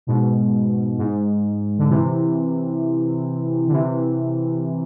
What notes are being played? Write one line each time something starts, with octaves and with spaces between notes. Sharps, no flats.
G#2 B2
G#2
D3
C3 E3
D3
C3 E3